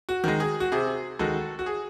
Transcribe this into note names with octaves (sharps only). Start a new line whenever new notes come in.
F#4
D#3 G#3
G#4
F#4
C3 G#4
D#3 G#3 F#4 A4
F#4
G#4